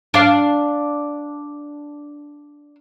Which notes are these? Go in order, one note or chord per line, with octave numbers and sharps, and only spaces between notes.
D4 F5